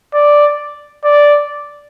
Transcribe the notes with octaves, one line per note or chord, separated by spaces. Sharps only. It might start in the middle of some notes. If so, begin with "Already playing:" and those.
D5
D5